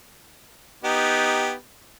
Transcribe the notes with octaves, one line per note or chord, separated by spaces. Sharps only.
B3 D#4 G4